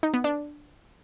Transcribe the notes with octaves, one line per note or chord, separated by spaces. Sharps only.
D#4
B3
D4